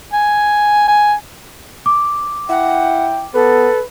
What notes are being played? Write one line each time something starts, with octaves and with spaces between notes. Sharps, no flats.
G#5
G#5
D6
E4 F#5 G5
B3 A4 B4